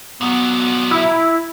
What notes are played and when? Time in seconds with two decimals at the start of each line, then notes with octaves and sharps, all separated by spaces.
0.21 A#2 F#3 B3
0.91 E4 E5